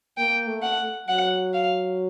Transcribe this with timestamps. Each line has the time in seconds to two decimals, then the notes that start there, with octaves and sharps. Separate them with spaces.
0.17 A#3 G5
0.48 A3
0.63 F#5
1.08 F#3 F#5
1.53 F5